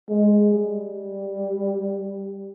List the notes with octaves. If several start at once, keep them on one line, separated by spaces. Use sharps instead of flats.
G#3
G3